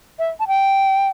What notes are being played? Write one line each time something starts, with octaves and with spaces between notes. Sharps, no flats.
E5
A5
G5